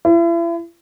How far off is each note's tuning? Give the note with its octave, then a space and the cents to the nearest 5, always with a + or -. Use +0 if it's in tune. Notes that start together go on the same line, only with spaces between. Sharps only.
E4 +40